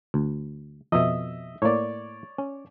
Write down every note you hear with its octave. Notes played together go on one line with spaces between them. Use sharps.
D2
F2 B2 D#5 E5
A2 A#3 C#5 D5
C#4